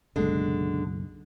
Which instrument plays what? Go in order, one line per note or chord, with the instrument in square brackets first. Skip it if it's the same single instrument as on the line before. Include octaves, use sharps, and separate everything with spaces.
[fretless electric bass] F#1 B1 [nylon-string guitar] D3 G#3